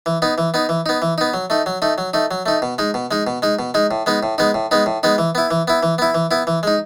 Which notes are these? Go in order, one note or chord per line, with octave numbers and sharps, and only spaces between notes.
E3
B3 D#4
E3
B3 D#4
E3
B3 D#4
E3
B3 D#4
F#3
A3 D#4
F#3
A3 D#4
F#3
A3 D#4
F#3
A3 D#4
B2
G#3 D#4
B2
G#3 D#4
B2
G#3 D#4
B2
G#3 D#4
A2
G#3 B3 D#4
A2
G#3 B3 D#4
A2
G#3 B3 D#4
A2
G#3 B3 D#4
E3
B3 E4
E3
B3 E4
E3
B3 E4
E3
B3 E4
E3
G#3 D#4